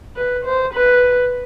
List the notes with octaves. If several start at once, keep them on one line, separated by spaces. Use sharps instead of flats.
B4
C5
B4